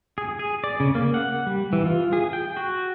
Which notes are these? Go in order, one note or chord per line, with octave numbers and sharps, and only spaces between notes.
G#4
G#4
D5
C#3
A#3
F#5
G3
E3
F4
G#4
G5
F#4